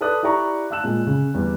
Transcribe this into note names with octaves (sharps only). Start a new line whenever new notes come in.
A4 B4 D5 A5 D#6 F#6
E4 G4 D5 A#5 C#6
F5 A5 E6 F#6 E7
A#2 G#3
C#3
E2 G3